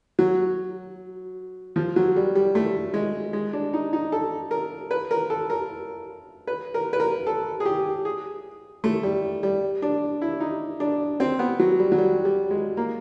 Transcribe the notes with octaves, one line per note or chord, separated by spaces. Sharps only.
F#3
F3
F#3
G3
G3
A3
G#3
G#3
D4
D#4
D#4
A4
A#4
B4
A#4
A4
A#4
B4
A#4
B4
A#4
A4
G#4
G4
G#4
A3
G3
G3
D4
E4
D#4
D4
C4
B3
F#3
G3
F#3
G3
G3
G#3
A#3